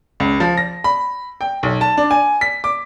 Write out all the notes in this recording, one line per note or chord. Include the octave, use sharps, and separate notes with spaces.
C#2
F3
A#6
B5
G5
B1
A5
D4
G#5
B6
D6